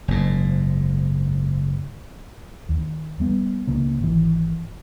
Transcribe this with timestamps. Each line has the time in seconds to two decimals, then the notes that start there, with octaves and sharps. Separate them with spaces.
0.08 F#1 G#2
2.69 D#2
3.20 G3 B3
3.67 C#2 C#3 A#3
4.00 G#1 E3